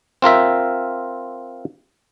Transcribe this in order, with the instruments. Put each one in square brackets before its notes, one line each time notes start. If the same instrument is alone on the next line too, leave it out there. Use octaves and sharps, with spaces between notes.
[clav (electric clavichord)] C4 F4 A#4 E5